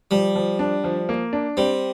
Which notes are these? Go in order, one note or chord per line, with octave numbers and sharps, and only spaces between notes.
F3 G3
F3
D4
F3
A#3
D4
G3 C4